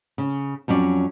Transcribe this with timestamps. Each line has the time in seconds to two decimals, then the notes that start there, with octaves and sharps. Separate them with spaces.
0.18 C#3
0.68 F2 F#3 C#4 D5